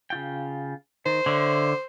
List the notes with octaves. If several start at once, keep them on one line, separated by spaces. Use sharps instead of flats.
C#3 F4 G5
D#3 C5
D3 C#5 E5